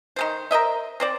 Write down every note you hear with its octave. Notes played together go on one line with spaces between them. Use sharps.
D#3 G#3 C5
A#4 C5 D#5 E5
C4 C5 D5